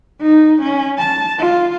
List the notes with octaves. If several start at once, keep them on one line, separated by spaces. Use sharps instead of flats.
D#4
C#4
A5
F4